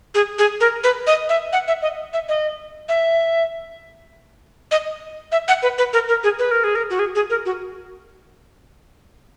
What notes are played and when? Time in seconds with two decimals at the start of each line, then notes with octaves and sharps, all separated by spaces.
0.15 G#4
0.39 G#4
0.61 A#4
0.84 B4
1.07 D#5
1.29 E5
1.53 F#5
1.68 E5
1.82 D#5
2.13 E5
2.29 D#5
2.89 E5
4.71 D#5
5.32 E5
5.48 F#5
5.63 B4
5.78 B4
5.93 A#4
6.09 A#4
6.24 G#4
6.39 B4
6.51 A#4
6.64 G#4
6.75 A#4
6.90 F#4
6.99 G#4
7.15 G#4
7.30 A#4
7.46 F#4